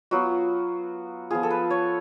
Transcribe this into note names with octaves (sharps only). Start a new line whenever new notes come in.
F#3 B3 F4 F#4
F3 B3 F4 G#4
A4
B4
C#5